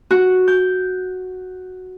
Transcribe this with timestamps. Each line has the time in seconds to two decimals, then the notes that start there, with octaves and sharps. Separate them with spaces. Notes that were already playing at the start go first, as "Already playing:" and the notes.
0.11 F#4
0.48 G6